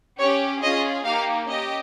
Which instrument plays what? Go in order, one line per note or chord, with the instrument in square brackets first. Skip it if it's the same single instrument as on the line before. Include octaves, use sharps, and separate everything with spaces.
[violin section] C#4 G4 C#5
C#4 F4 G#4 D#5
A#3 D#4 G4 F5
C#4 G4 D#5